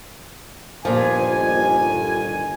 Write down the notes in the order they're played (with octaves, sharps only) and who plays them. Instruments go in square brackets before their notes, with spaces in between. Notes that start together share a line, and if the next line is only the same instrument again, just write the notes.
[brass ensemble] G1 D#2 G#5 [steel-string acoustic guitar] A#2 F3